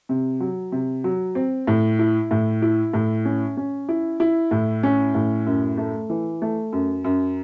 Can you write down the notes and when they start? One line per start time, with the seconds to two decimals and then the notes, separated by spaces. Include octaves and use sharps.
0.09 C3
0.40 F#3
0.72 C3
1.04 F#3
1.35 C4
1.67 A2
1.99 E4
2.31 A2
2.62 E4
2.93 A2
3.25 C#4
3.57 C#4
3.89 E4
4.20 E4
4.51 A2
4.83 C#4
5.15 A2
5.46 F#2
5.77 A3
6.10 E3
6.42 A3
6.72 F#2
7.04 F#2